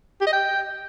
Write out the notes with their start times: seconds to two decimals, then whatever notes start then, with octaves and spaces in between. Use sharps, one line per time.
0.21 G4
0.27 D#5
0.33 G5